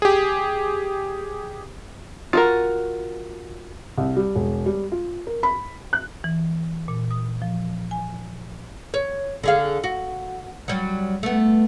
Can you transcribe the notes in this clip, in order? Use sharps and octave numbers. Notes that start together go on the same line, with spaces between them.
G4 G#4
F4 F#4 A#4
C2
G3
E1
G3
F4
A#4
B5
F#6
E3
A#2
D#6
F3
G#5
C#5
D3 G#4 F5
F#4
F#3 G3
A3 B3